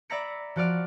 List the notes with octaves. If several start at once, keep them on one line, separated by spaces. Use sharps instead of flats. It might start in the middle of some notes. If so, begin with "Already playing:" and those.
D5 E5 A#5 B5 A#6 C#7
F3 F#4 D5 F6 D7